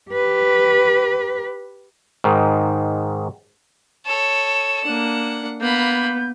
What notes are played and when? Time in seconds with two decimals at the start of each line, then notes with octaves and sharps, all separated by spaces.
0.11 G4 B4
2.24 G#2 D#3
4.06 A4 C#5 E7
4.85 A#3 D4 F#5
5.61 A#3 B3 B5 G6